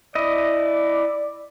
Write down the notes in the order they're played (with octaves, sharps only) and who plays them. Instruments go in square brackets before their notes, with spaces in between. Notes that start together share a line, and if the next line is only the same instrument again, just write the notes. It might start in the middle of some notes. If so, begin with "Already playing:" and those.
[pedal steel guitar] E4 D#5 [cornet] D5